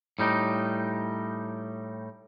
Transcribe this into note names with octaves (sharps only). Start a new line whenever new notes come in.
A2 G3 D#4